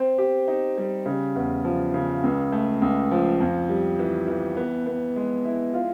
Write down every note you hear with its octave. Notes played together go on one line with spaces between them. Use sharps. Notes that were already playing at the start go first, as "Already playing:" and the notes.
Already playing: C4
G4
D#4
G3
C#3
E2
F3
C#3
C#2
A3
C#2
F3
F2
G3
E3
E3
B3
B3
G#3
E4
F4